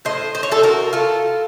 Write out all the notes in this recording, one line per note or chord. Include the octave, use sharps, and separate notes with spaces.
A2 C5 D#5
C5
C#5
A3 A4 C5
F#4 A#4
A2 F4 A4